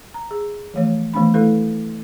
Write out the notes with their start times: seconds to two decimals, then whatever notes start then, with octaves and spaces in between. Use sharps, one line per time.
0.14 A#5
0.31 G#4
0.74 E3 F3 A3 C#5
1.14 D#3 E3 A3 B3 D4 B5
1.34 A3 E4 A4 B4